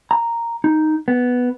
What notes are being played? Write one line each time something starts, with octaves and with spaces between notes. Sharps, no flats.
A#5
D#4
B3